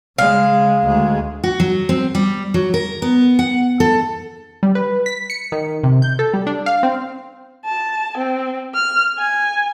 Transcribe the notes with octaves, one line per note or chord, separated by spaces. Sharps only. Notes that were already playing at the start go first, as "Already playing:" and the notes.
C#3 G#3 F5
D2 G#3
F#4
F#3
C4
G3
F#3
A#4
B3
F#5
A4
G3
B4
B6
C#7
D#3
C3
G6
A4
G3
D4
F5
C4
A5
C4
F6
G#5